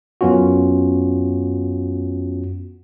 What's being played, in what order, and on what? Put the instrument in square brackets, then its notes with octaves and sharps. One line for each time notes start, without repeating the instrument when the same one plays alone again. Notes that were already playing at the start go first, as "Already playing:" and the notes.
[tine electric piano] F#2 B3 C#4 F4 F#4